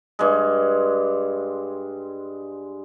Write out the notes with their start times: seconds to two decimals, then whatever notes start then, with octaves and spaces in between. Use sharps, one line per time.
0.19 G2 G#3